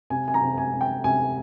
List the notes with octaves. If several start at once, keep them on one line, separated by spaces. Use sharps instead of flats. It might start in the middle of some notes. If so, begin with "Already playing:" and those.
C3 G#5
G#5
A#5
C3
G#5
C3
G5
C3 G#5